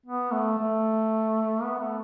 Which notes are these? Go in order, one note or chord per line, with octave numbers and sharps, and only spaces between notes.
B3
A3
A3
B3
A3